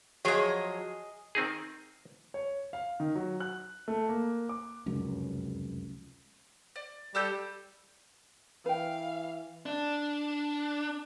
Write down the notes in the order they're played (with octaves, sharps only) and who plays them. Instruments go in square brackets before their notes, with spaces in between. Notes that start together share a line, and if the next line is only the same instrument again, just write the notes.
[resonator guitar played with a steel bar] F3 F#3 C#5 [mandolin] G#4 D#5
[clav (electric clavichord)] D#3 C4 D#4 G#4
[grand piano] C#5
F5
D#3
F#3
F#6
A3
A#3
D6
[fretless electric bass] F1 C#2 F#2
[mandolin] D5
[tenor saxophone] G3 [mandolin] A4 E6 G6
[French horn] E3 [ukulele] B4 G5 [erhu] F5
[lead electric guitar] D4